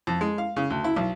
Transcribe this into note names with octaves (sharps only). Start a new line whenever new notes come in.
F2
G#3
F5
C#3
D2
E4
B1